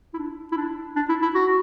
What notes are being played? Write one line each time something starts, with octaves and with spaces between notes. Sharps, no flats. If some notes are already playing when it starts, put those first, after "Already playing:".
E4
D4
E4
D4
D4
E4
E4
F#4